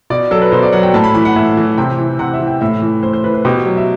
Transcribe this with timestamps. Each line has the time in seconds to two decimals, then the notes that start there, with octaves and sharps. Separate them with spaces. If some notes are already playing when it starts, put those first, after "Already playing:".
0.10 B2 D5
0.31 F#3 A4
0.42 B4
0.52 B2 C5
0.63 D5
0.72 F#3 F#5
0.83 G5
0.94 A2 A5
1.04 B5
1.14 E3 B5
1.25 F#5
1.36 A2 E5
1.57 E3
1.78 C3 G5
1.98 E3
2.19 C3 F#5
2.34 E5
2.40 E3
2.47 G5
2.61 A2 E5
2.82 E3
3.03 A2 C5
3.13 C5
3.24 E3 B4
3.34 B4
3.45 B2 G4
3.66 F#3
3.77 E5